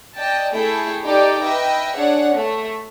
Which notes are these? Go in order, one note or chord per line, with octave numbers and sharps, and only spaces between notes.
D5 D#5 G5 A5
A3 E4 G#4 A4 G5
D#4 G4 A4 D5 G5 D6
B4 D#5 E5 G5
D4 G#4 C#5 F#5
A3